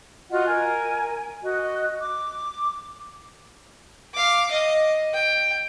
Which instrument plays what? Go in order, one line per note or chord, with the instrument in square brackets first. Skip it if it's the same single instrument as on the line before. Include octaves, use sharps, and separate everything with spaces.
[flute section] F4 F#4 D#5 F#5
A#4 G#5
F#4 D#5
D6
[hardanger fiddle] F5 D6
D#5
G5